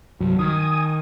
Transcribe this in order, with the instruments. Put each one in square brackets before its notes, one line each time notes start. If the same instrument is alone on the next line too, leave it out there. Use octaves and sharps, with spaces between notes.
[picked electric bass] C2 G2 [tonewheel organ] F#3
[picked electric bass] D#3 [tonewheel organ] G#5 D#6